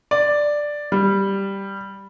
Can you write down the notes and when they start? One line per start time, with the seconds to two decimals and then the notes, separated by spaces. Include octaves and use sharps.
0.11 D5
0.92 G3